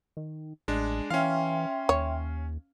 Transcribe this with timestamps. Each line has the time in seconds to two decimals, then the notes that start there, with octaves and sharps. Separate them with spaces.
0.17 D#3
0.68 A1 G#3 D4
1.10 E3 C#4 E5 F5 G5 C6
1.89 D#2 C#5